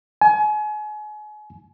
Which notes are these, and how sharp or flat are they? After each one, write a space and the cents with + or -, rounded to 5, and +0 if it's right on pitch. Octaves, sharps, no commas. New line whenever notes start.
G#5 +35